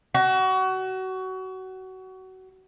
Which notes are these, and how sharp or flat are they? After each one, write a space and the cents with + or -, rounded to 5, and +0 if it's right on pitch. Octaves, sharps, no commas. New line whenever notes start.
F#4 +25